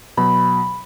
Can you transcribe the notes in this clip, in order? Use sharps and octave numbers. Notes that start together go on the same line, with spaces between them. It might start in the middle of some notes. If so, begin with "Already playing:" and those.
B2 F#3 B5